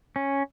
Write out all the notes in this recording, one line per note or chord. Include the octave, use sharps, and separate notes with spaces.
C#4